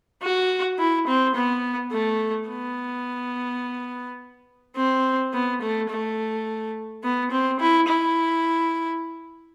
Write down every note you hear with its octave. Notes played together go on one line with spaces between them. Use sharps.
F#4
E4
C4
B3
A3
B3
C4
B3
A3
A3
B3
C4
E4
E4